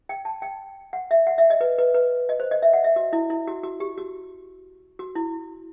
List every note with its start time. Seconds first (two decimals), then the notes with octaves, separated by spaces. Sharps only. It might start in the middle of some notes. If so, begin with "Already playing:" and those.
0.09 G5
0.25 A5
0.42 G5
0.93 F#5
1.11 E5
1.27 F#5
1.38 E5
1.50 D#5
1.61 B4
1.78 B4
1.94 B4
2.29 D#5
2.40 C5
2.51 D#5
2.62 E5
2.73 F#5
2.84 E5
2.96 F#4
3.13 E4
3.30 E4
3.47 F#4
3.63 F#4
3.80 G4
3.98 F#4
4.99 F#4
5.15 E4